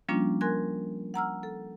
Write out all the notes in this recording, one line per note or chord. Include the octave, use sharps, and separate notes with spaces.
F3 G3 A#3 C#4 D4 F4
A#4 G#5 C6 F#6 G#6
F#5 A#5 E6 F6
A4